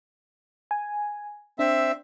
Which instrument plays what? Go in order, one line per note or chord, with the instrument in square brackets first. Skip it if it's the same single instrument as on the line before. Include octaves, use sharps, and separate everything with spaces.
[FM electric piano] G#5
[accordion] C4 E5 [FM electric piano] D4